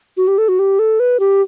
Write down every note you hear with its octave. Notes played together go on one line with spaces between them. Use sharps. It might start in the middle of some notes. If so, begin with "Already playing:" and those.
F#4
G4
A4
F#4
G4
A4
B4
G4